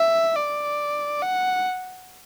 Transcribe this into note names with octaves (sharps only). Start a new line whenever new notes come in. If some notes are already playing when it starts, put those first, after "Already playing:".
Already playing: E5
D5
F#5